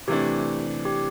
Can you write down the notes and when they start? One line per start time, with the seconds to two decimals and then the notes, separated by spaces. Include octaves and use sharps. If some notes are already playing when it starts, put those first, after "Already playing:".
0.08 C3 E3 A3 D4 G4
0.85 G4